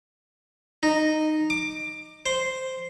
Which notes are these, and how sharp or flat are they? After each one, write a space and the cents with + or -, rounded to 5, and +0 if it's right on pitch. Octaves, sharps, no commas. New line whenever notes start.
D#4 -10
D6 +20
C5 -5